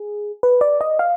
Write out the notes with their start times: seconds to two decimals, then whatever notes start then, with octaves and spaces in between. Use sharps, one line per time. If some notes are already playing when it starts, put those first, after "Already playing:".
Already playing: G#4
0.43 B4
0.61 D5
0.81 D#5
0.99 F5